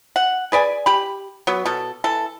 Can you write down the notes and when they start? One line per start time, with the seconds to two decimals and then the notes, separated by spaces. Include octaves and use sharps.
0.16 F#5
0.52 G#4 B4 D5 G#5
0.86 G4 B5
1.47 F#3 B3
1.66 B2 A4
2.04 E3 A4